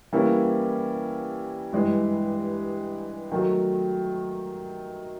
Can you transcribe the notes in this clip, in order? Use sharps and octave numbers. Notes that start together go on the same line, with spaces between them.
E3 G3 A#3 C#4 E4
G2 E3 G#3
D#3 F#3 A3